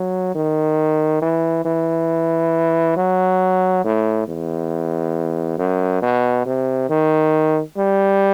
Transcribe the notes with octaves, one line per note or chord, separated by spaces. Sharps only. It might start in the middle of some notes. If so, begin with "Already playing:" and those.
Already playing: F#3
D#3
E3
E3
F#3
A2
E2
F#2
B2
C3
D#3
G3